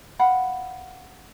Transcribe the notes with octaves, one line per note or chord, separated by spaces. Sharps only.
F5 F#5 B5